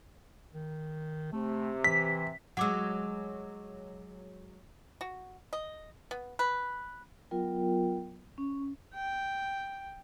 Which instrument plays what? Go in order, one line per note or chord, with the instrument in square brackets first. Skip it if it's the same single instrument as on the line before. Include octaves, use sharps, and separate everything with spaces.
[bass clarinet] D#3
[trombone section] C3 [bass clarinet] A3
[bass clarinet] E3 [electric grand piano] B6
[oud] F#3 G#3 [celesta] F#5 D6 E6
[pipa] F#4
D#5
B3
B4
[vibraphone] F#3 B3 F4 A#4 G5
C#4
[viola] G5